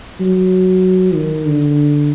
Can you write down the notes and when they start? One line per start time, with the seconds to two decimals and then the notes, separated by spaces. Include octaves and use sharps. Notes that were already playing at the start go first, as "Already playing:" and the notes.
0.20 F#3
1.14 D#3
1.46 D3